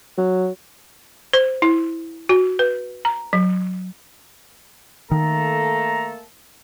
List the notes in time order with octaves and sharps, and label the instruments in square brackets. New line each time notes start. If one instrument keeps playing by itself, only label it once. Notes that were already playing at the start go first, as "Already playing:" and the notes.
[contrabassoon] F#3
[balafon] C5
E4
F#4
B4
A#5
F#3
[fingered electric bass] D#3 [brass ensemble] A3 A#3 A4 [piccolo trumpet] A#5